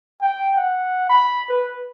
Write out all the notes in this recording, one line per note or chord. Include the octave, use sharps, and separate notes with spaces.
G5
F#5
B5
B4